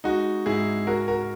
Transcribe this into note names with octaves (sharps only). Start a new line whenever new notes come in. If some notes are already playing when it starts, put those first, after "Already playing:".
G#3 D#4 F#4
G#2 E4 G#4
G#3 F#4 A#4
F#4 A#4